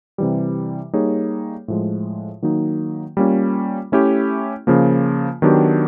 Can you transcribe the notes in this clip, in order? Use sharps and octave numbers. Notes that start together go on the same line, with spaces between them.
C3 E3 G3
G3 A#3 D#4 G#4 C#5
A2 F3 G#3
D#3 F#3 A#3 D#4
G3 A#3 C#4 F4
A3 C#4 E4 G4
C#3 F3 A#3
D#3 F#3 B3 D4 G4